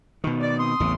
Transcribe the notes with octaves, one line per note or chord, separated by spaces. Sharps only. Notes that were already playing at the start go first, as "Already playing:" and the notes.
B2 D#3
D5
C4 C6 D#6
A1 E2 C#3